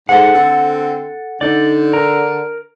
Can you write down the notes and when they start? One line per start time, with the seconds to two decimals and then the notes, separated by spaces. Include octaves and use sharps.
0.09 G#2 A4 F#5
0.34 D3 C4
1.41 D3 D#4 D5
1.93 A#4 A#5